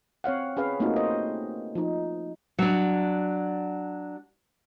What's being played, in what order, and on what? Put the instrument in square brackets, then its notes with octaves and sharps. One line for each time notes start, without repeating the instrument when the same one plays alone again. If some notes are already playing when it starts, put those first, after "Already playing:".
[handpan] C4 C#5 F5 F#5
C#4 G#4 B4 F5
A3 A#3 C4 D#4 F4 F#4
C5 D#5
F3 D#4
[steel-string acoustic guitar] F#3 D4